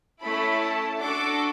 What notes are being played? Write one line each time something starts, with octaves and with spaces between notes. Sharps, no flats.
A3 C#4 E4 A4 B5
A5
D4 F#4 A4 D6